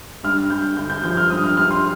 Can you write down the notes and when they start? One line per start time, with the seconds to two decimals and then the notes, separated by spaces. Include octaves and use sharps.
0.23 G2 F6
0.50 G2 G6
0.77 D3 G6
0.90 G6
1.03 F3 G6
1.17 F6
1.30 G2 D#6
1.44 F6
1.56 G2 F6
1.71 C6